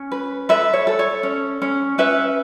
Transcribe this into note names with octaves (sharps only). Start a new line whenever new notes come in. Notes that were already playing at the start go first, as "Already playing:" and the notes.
Already playing: C#4
B4
A4 B4 E5
C#5
A4
C#5
C#4
C#4
C#4 B4 E5